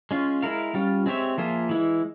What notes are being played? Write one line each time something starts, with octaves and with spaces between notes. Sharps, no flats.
G#3 C#4 F4
G#3 E4 A#4 F5
G3 C#4 F4
G#3 C4 G4 C#5 E5
F3 A#3 F4 G#4 E5
E3 G#3 E4